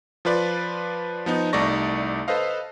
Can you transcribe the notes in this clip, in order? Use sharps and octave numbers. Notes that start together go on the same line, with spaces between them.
F3 F4 B4 D5
F3 B3 D#4
C2 A3 D#4 D5 C#6 A#6
A4 B4 C5 D#5 F5